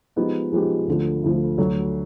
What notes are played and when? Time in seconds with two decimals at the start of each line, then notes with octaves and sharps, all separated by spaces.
0.16 F3 G#3 B3 D#4 G4
0.52 F3 G#3 B3 D#4 G4
0.87 D2 D3 F3
1.23 D2 D3 F3
1.58 D2 D3 F#3